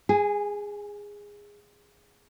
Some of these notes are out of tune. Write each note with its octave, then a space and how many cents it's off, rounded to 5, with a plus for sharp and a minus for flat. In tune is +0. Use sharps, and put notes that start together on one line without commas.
G#4 -15 G#5 +25